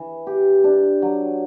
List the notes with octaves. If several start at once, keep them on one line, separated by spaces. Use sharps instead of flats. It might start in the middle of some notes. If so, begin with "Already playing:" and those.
Already playing: E3
G4
D4
F#3